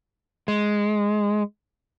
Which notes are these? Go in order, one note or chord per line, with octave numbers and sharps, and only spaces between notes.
G#3